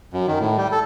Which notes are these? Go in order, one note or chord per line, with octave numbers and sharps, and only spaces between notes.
F#2
D#3
A2
G3
A4